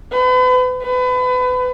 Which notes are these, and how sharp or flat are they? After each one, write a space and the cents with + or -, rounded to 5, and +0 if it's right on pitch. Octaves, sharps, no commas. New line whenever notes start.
B4 +40
B4 +30